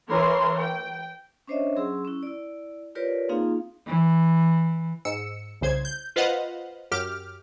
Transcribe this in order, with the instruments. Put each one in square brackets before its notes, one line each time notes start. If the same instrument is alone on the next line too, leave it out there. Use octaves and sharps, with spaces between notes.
[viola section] E3 A#4 C#5 C6
G5
[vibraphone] C#4 D4 C5 C#5 D#5 E5
F#3 C#4 G#4 C6 E6
C#4 E4
E4 D5
F4 G4 A#4 B4 C#5 D5
A#3 C4 D#4 F4 G#4 F5
[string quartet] E3
[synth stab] G#2 E6 C#7
C2 C#3 C5 G#6
G6
F4 B4 C5 D#5 F5 F#5
F#2 G4 D6 F6